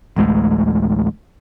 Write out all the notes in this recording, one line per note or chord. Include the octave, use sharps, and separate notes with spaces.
A1 D2 G#3 A3